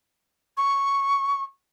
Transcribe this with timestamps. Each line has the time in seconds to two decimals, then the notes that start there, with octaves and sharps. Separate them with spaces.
0.57 C#6